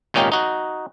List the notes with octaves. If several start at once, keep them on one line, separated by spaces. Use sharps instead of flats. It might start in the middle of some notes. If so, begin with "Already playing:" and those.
G#1 A#2 C#4 D#4 G4 F5
D#4 F#4